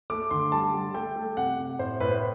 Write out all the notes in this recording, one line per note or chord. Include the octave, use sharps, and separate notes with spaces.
A3 D6
D3 C6
G3 A5
G3
A3 G5
A3
C3 F#5
C3
A2 C5
A2 B4
C5